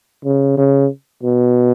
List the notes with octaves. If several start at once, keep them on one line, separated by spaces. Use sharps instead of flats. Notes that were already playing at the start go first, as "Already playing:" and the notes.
C#3
C#3
B2